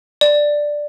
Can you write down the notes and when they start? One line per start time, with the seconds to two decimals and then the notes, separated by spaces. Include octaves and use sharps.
0.21 D5